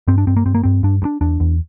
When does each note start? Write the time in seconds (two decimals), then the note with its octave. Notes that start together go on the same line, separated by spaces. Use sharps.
0.08 G2 C4
0.18 D4
0.27 G2 C4
0.37 A#3
0.46 G2 C4
0.55 A#3
0.63 G2 C4
0.83 G2 D4
1.02 G2
1.05 D4
1.21 E2 D4
1.40 E2